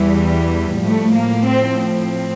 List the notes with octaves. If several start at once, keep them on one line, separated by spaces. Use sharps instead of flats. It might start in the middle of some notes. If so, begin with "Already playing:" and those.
Already playing: E2 E3 G3
A2 F3 A3
A#3
C4
C4